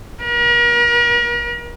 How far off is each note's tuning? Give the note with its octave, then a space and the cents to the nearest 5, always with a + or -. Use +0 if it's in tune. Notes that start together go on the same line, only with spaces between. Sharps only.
A#4 +40